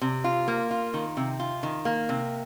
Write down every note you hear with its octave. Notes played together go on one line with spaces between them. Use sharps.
C3
F4
A#3
F4
D#3
C3
F4
D#3
A#3
C3